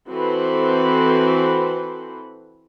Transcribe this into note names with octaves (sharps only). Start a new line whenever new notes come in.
E3 C4 F#4 A4 B4 C5